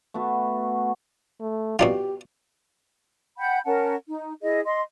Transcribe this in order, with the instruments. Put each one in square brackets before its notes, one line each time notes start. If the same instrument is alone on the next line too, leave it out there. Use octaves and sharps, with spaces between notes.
[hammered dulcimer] A3 B3 F#4
[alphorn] A3
[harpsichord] B2 D4 F4 [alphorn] G4
[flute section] F#5 G5 B5 G6
C#4 A#4 F#5 A5
D#4
E4 G#4 D#5
D#5 C6